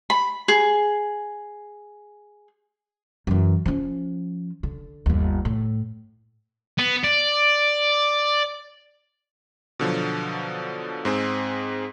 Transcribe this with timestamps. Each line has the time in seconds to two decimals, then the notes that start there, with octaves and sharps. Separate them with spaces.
0.10 B5
0.48 G#4
3.27 F#2 E3
3.66 F3 C#4
4.63 D3
5.06 G1 D#2
5.45 A2
6.78 B3
7.04 D5
9.79 B2 D3 F3 F#3
11.05 G#2 C4 G#4